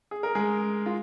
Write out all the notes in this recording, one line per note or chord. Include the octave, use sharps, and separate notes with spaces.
G#4
A#4
G#3 G#4
F4